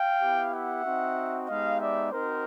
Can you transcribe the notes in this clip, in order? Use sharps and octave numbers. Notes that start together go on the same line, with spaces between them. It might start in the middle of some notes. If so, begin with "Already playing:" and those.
Already playing: F5 G5
B3 E4 G4
E5 F#5
C4 D#4 F#4
G#3 B3 D#4 G4 D#5 F5
D5 E5
C4 D#4 F#4 A#4 C5